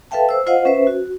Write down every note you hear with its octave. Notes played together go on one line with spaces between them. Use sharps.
A4 B4 E5 F5 G5 A5
C5 E6
F4 C5 D#5 F5 F#5
C#4 B4 C5 E5
F#4